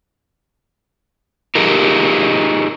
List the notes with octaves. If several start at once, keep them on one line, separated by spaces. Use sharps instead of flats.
D#4 F4 G4 G#4 A#4